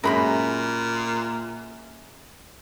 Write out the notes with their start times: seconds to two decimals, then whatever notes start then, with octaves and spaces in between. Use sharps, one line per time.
0.04 F#2 A#2 G#3 A#4 B5 C6